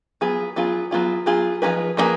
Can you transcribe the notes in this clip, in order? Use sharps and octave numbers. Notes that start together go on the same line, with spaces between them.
F#3 B3 F4 G#4
F#3 B3 F4 G#4
F#3 B3 F4 G#4
F#3 B3 F4 G#4
F3 A#3 D#4 G#4 B4
F3 A#3 D#4 G#4 B4